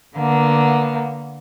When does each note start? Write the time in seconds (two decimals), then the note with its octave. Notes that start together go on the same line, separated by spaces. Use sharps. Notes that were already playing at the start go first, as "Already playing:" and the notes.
0.17 D3 A#3 B3